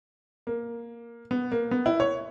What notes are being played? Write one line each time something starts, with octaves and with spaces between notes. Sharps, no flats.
A#3
B3
A#3
B3
E4
C#5